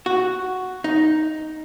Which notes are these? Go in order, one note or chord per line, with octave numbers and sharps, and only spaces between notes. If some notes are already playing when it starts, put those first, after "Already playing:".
F#4
D#4